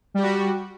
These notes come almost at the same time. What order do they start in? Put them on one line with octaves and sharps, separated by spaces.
G3 G4 F#4